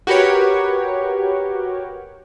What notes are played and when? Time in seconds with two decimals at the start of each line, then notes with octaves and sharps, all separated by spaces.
0.07 F#4 G4 A#4 B4 C#5